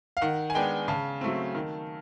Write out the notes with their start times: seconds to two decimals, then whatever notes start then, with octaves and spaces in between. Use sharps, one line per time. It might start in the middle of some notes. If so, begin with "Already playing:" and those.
0.17 F5
0.22 D#3 F#5
0.50 G#5
0.55 G#3 B3 D4 G5
0.88 C#3 A5
1.21 F#3 A3 C4
1.55 D#3